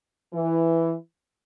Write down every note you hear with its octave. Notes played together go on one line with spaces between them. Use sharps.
E3